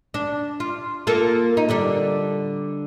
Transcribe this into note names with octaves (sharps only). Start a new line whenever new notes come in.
D4
F4
A#3 F4 A4
D#4
D3 G3 D4